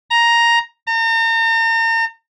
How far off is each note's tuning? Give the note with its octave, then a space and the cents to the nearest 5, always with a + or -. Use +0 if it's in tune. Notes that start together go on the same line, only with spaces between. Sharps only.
A#5 +5
A#5 -40